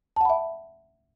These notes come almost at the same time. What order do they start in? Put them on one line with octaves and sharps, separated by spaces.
A5 F#5 B5 E5